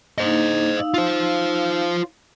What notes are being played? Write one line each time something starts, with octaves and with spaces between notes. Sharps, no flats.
A#3 D4 D#4 C5 D#5
D#4 F5 E6
F4 C5